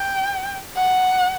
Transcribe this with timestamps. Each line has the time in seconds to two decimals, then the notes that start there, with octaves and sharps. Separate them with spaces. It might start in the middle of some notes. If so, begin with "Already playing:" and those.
Already playing: G5
0.76 F#5